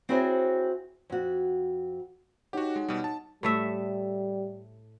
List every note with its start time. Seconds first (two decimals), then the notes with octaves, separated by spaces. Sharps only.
0.09 C4 E4 F#4 G#4 C5 C#5
1.10 F2 F#4
2.53 D#4 F#4 G4 C#5 F#5
2.76 G#3
2.88 B2 G3
3.04 A5
3.43 A2 G3 A3 E5